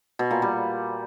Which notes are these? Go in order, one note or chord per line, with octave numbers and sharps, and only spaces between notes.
B2
A#2
G3